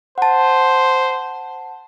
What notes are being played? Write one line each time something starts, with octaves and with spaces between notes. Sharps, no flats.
C5 F#5 A5